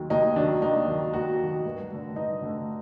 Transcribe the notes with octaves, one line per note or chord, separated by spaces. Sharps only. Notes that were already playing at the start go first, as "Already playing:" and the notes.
Already playing: D#2 D#3 F#3
D#2 D#4
D#3 F#3 D4
D#2 D#4
D#3 F#3
D#2 F#4
D#3 F#3
G2
D3 A3
G2 D#4
D3 A3